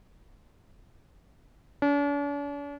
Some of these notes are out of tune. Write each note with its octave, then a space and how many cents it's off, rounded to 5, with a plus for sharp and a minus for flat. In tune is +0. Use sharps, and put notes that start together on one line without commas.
D4 -45